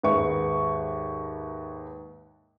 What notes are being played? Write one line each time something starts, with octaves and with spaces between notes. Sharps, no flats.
D#2 G#2 B4 E5 C#6